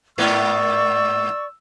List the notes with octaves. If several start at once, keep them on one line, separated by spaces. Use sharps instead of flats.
G#2 A#3 B3 D5 C#6 E6